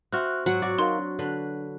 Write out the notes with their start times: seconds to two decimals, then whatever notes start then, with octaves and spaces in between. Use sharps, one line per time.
0.12 C4 F#4 E5 F6 F#6
0.46 G#2 F#3 F#5
0.62 F#4 D5
0.79 D#4 A#4 F5 C6
0.99 D4
1.19 D3 B4